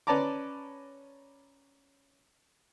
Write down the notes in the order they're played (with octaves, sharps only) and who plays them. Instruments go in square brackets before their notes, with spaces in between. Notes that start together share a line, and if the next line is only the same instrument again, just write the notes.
[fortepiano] C#4 B4 D5 A5 A#5 D6